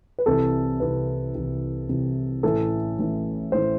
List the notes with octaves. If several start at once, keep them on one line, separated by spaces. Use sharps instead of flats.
B4
C2 C3 E3 A4
C2 C3 E3 B4
C2 C3 E3
C2 C3 E3
A1 A2 E3 A4
A1 A2 E3
A1 A2 E3 C5